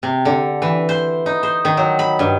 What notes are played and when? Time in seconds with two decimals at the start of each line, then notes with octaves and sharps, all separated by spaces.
0.03 C3
0.25 D3
0.62 E3
0.89 C5
1.26 D#4
1.43 C5
1.65 D#3
1.77 F#3
1.99 B5
2.19 G2